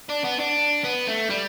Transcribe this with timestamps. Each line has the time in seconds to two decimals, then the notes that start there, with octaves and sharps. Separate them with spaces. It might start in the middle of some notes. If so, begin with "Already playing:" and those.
0.09 D4
0.24 B3
0.39 D4
0.84 B3
1.07 A3
1.30 G3